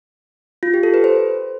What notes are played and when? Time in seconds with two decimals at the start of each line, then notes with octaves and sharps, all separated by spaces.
0.63 F4
0.74 G4
0.83 A4
0.94 B4
1.04 C5